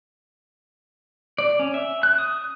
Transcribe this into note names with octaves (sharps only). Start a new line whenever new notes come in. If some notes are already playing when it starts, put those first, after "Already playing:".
D5
C#4
E5
F#6
D#6